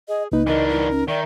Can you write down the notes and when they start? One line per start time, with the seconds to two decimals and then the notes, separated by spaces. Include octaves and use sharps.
0.08 G#4 D#5
0.32 C#2 A#3 D#4 B4
0.47 E3 D4 A#4 D#5
0.69 E4
0.90 C#4
1.08 D#3 D5 E5